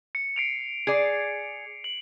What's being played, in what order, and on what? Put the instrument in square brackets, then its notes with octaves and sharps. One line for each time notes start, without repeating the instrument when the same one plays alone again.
[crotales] C#7
C7 D7 F7
[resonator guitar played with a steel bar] G#4 D5
[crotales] F#7